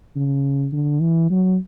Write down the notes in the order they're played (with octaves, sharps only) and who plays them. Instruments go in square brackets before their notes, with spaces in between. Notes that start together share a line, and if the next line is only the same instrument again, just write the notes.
[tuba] C#3
D3
E3
F#3